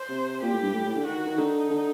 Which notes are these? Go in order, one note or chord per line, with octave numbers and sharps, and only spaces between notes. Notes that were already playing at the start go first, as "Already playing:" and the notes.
Already playing: C5
C3
A#2 G4
A2
G2
A2
A2
D3
D#3 F#4
D#3
D3 D#4
D3